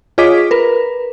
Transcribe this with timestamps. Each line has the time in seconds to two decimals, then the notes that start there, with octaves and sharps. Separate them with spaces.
0.18 F4 G#4 C#5 D#5 D6 B6
0.51 A#4 B4